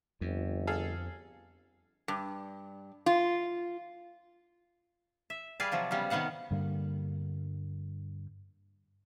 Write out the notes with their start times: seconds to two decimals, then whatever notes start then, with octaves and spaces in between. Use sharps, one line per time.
0.21 G1 F2
0.67 G#4 A4 F5
2.08 G2
3.06 F4
5.30 E5
5.60 G3 G#4 B4 D5 F5
5.72 C3 F3 F#3
5.91 C#3 G3 B3 F5
6.10 C3 D#3 B3 F5 F#5
6.51 G2 D3 G3 A#3